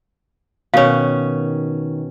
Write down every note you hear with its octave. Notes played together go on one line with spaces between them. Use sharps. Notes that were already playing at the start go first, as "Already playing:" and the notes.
B2 D#3 C#4 C#5 F5